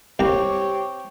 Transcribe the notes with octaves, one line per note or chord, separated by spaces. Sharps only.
C2 C4 G4 C#5 A#5